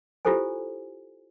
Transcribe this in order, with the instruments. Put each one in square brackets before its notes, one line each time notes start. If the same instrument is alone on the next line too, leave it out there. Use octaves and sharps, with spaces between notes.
[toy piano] E4 F4 G4 A4 C5 G#5